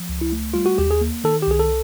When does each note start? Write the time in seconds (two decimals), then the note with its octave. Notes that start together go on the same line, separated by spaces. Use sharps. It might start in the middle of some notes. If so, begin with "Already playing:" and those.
Already playing: F3
0.09 C#2
0.21 E4
0.32 A3
0.54 G3 F4
0.66 F#4
0.78 D#2 G4
0.91 G#4
1.01 A#3
1.24 D#3 A4
1.42 G4
1.47 C2 G#4
1.60 A4